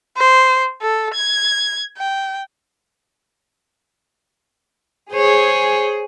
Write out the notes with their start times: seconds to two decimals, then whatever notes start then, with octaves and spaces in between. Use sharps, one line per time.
0.18 C5
0.82 A4
1.14 G#6
1.98 G5
5.13 G#4 C5 C#5